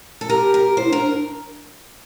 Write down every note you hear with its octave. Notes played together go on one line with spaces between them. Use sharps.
A4
G4 A#4
A#4
E4 C5
D4
A#4
D4